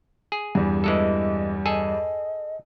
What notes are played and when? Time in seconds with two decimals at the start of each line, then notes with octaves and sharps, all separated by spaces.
0.32 G#4
0.55 E2 G2
0.84 E3 G#3 A4 D#5
1.66 G#4 A4 D#5 G#5